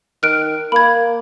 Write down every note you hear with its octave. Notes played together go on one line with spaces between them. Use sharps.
D#3 F6 F#6 D7
A#3 B5 G#6